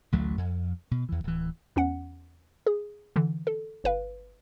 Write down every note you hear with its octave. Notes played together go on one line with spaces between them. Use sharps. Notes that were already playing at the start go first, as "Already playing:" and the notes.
A1 D2 F#3 A3
F2
B2
E2 E3
D1 E3
E2 C#4 F#5
G#4
D3 E3
A4
G1 B4 F5